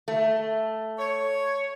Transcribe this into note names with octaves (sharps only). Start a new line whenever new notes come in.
A3
C#5